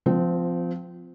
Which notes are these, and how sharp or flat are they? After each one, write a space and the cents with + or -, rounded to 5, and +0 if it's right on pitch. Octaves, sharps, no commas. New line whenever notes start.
F3 +0 C4 -25